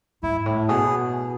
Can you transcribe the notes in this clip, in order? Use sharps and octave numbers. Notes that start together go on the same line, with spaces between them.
G#2 E4
A2
B2 G#4